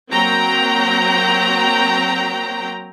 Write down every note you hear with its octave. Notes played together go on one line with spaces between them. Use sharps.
F#3 A#3 C4 G5 A#5